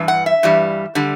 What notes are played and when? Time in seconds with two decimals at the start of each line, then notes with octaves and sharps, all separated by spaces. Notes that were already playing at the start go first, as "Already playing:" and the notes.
Already playing: G2 E3
0.08 F#5
0.26 E5
0.43 G2 E3 G3
0.95 D3 G3